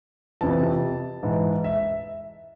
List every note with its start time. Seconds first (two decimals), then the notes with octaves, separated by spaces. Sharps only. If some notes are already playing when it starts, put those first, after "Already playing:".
0.41 F2 C3 E3 A5
1.23 G#2 E3
1.64 E5